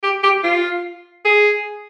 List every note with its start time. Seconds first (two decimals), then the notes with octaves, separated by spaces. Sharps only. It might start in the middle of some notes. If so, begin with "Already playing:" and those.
0.03 G4
0.23 G4
0.43 F4
1.25 G#4